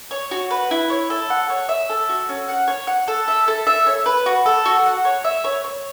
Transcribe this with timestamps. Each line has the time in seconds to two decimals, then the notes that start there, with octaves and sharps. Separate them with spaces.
0.11 C#5
0.31 F#4
0.51 B4
0.71 E4
0.90 C#5
1.10 A4
1.30 F#5
1.50 C#5
1.69 E5
1.89 A4
2.09 F#4
2.29 C#4
2.49 F#5
2.68 C#5
2.87 F#5
3.08 A4
3.28 E5
3.48 A4
3.67 E5
3.87 C#5
4.06 B4
4.26 F#4
4.46 A4
4.65 F#4
4.86 F#5
5.05 C#5
5.24 E5
5.44 C#5
5.64 C#5